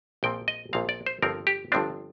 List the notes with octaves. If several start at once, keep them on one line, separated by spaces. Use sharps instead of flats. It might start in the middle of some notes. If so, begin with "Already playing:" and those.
A#1 A#2 F3 C4 G5
D#5
A#1 A#2 F3 C4 F5
D5
C5
G1 G2 F3 C4 A#4
G4
G1 G2 F3 C4 D4